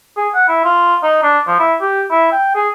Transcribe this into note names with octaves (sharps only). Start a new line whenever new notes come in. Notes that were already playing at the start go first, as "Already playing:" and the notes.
G#4
F#5
E4
F4
D#4
D4
F3
E4
G4
E4
G5
G#4